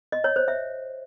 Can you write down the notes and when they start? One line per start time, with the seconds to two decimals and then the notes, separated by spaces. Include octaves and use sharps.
0.12 D#5
0.24 C#5
0.36 C5
0.48 E5